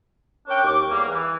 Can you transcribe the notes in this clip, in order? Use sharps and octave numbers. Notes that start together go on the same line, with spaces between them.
C#4 D4 A#4 C#5 G5
D#2 C#6 D6
E2 G3 A#3
E3